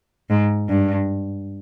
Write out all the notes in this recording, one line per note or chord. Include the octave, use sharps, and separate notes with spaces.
G#2
G2